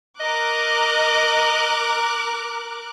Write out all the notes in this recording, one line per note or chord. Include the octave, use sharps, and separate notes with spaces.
A#4 D#5 D6 F#6